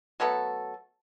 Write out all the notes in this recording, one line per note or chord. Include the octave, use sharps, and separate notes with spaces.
F#3 A3 B3 A4